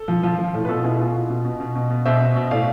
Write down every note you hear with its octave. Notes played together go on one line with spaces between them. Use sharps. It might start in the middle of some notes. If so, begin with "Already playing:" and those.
Already playing: A4
F3
F3 F4
F3
A2
B4
B2 F4 A4
B2 E4 G#4
B2 F4
B2 F4
B2
B2
B2
B2
B2
B2 C5 E5
B2
B2
A2 D5 F5